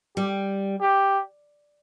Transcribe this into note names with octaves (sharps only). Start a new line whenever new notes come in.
G3 G4
G4